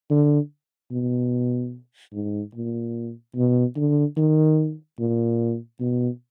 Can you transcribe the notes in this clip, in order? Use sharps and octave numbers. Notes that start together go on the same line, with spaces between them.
D3
B2
G#2
A#2
B2
D3
D#3
A#2
B2